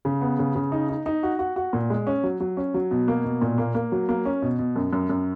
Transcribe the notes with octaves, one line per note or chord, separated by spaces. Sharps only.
C#3
B3
C#3
C#3
D#4
D#4
D#4
F#4
F#4
F#4
A#2
G#3
C#4
F#3
F#3
C#4
F#3
B2
A#3
B2
A#2
A#3
A#3
F#3
A#3
C#4
B2
B2
F#2
F#2
F#2